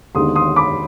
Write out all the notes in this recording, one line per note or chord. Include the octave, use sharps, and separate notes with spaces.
D#2 D3 G#3 B3 D#4 C6 D#6
C6 D#6
B5 D6